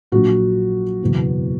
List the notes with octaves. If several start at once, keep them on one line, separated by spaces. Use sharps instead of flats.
A#1 A#2 F#3 F#4
F#1 E2 B2 F#3